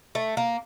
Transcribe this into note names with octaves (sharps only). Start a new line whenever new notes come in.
A3
A#3